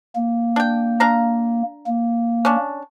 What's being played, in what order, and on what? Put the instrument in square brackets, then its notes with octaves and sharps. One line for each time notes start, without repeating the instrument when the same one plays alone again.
[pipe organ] A#3
[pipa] D4 G5
D4 F5 A#5
[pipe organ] A#3
[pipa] C#4 D4